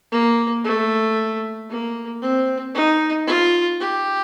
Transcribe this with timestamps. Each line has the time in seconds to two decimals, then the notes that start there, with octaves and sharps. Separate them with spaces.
0.12 A#3
0.64 A3
1.70 A#3
2.22 C4
2.75 D#4
3.27 F4
3.80 G4